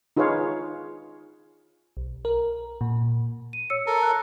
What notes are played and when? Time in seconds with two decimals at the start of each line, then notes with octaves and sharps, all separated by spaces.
0.17 D#4 F4 G#4 B4 C#5 F5
1.97 B1
2.25 A#4
2.81 A#2
3.53 D#7
3.70 C#5 E6 C#7
3.86 A4 A#4
4.03 F#6